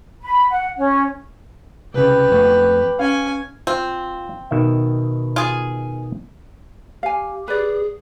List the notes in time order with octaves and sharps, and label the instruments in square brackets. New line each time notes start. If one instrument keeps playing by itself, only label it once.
[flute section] B5
F#5
C#4
[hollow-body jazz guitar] C2 C#3 [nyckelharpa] G4 B4
[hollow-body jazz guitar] F2 A3 B3
[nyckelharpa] C#4 G#5 [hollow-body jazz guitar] F5
[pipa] C4 [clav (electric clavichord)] F4 F5
[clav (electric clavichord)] B2 D#3 E5
[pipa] F4 G#4
[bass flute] G4 [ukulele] F5 G#5
[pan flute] G#4 [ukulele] B4 D5